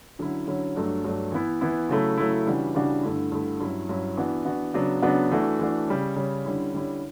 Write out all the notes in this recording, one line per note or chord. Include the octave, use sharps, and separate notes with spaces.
D3 F#3 C#4 E4
D3 F#3 C#4 E4
G2 F#3 A3 D4
G2 F#3 A3 D4
E3 B3 E4
E3 B3 E4
C#3 F#3 A3 E4
C#3 F#3 A3 E4
C#3 E3 G3 D4 F#4
C#3 E3 G3 D4 F#4
G2 D3 A3 E4
G2 D3 A3 E4
G2 F#3 C#4 E4
G2 F#3 C#4 E4
E3 B3 D4 F#4
E3 B3 D4 F#4
C#3 F#3 B3 D4 F#4
C#3 F#3 B3 D4 F#4
E3 A3 D4 F#4
E3 A3 D4 F#4
C#3 G3 C#4
C#3 G3 C#4
D3 G3 C#4 E4
D3 G3 C#4 E4